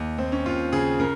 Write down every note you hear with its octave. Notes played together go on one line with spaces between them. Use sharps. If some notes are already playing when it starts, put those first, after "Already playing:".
Already playing: D#2
D#2 C4
C#4
D#2 F4
C#3 G#4
C#3 A#4